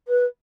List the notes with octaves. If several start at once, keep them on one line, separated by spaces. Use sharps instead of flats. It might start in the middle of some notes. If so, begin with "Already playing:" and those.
B4